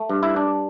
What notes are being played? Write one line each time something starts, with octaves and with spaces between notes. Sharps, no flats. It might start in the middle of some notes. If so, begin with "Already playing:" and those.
Already playing: A3
G2
E4
D4